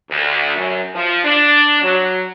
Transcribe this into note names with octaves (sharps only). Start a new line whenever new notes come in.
D2
F#2
F3
D4
F#3